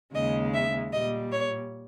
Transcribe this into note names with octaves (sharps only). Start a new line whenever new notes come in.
D#2 C#3 G#3 D#5
E5
A#2 G3 D#5
C#5